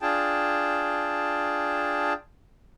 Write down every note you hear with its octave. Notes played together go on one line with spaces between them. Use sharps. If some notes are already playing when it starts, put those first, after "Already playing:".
D4 F4 G#4 G5 A5